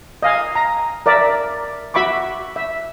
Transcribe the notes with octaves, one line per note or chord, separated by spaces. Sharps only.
D#5 F5 G#5
A#5
A#4 D5 E5 A#5
F#4 E5 B5 C#6 D6
E5